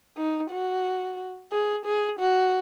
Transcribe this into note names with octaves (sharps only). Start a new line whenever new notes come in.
D#4
F#4
G#4
G#4
F#4